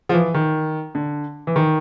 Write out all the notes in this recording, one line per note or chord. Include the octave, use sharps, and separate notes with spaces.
F3
E3
D#3
D3
E3
D#3